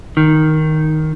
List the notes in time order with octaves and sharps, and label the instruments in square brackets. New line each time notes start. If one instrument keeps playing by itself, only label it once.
[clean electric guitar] D#3